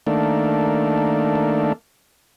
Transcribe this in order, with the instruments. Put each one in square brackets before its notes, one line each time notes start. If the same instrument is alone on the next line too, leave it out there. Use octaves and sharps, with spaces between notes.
[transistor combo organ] D#3 A3 A#3 D4